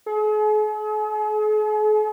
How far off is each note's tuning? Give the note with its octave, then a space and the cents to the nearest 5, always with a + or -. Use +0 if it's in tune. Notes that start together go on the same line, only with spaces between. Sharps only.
G#4 +45